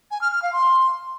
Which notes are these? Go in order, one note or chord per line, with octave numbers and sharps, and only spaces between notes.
G#5
F6
F6
F5
C6